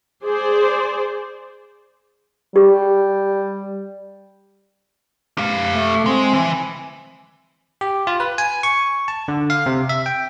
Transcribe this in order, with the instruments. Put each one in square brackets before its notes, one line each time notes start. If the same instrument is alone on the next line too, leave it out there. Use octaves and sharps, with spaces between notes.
[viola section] G#4 C5 D5
[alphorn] G3 [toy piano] G4
[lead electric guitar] G4 F5
[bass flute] A3
[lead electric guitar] G#3 [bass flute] C4
[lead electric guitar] E3
[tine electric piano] G4
F4
B4
G#5
C#6
A5
D3
F5
C3
E5
G5